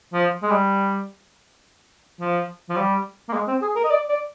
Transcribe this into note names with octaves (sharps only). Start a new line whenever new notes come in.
F3
G#3
G3
F3
F3
G3
A#3
G#3
C4
G#4
A#4
D#5
D5
D5